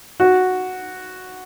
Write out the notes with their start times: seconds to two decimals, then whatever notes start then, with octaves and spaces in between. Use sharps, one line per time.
0.20 F#4